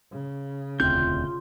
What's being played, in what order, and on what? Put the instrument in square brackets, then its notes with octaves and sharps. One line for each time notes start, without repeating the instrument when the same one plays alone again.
[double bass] C#3
[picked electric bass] E1 D2 C4 [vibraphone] F4 C6 [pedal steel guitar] G6